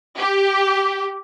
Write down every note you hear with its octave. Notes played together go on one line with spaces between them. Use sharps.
G4